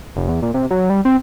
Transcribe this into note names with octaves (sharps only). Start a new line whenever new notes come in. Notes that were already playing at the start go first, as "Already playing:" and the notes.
F1
E2
A#2
C3
F#3
G3
C4